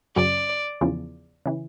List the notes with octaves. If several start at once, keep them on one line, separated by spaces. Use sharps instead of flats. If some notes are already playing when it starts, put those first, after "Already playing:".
F#2 C#3 F#3 D5
E2 C#3 F3
C#3 E3